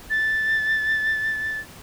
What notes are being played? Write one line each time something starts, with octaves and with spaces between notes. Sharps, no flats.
A6